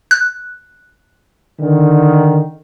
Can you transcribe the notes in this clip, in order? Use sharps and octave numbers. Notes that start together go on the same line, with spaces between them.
F#6
D3 D#3